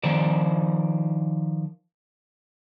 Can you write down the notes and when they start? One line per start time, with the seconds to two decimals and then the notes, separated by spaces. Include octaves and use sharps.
0.03 D#3 F3 C5 D5